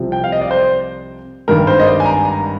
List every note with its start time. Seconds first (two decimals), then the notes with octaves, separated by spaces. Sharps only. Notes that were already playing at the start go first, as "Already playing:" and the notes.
Already playing: C2 C3 F3
0.12 G5
0.24 F5
0.32 D#5
0.41 D5
0.51 C5
1.48 G#1 G2 D#3 A#4
1.67 C5
1.80 D#5
1.87 D5
2.00 G#5
2.06 A#5
2.25 A#5